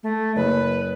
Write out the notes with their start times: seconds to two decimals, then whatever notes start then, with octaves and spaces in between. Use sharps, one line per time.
0.03 A3
0.36 F#1 B4